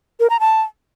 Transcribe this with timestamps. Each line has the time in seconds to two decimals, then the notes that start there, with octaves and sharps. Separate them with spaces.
0.20 A#4
0.30 A#5
0.40 A5